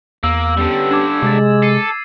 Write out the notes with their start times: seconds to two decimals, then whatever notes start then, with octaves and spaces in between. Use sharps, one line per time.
0.23 E2 A#3 E6
0.57 D3 G3 B3 C#4 G4
0.91 D4 D6 G#6 E7
1.22 C3 G#3 D6 A6
1.63 A4 C7 D#7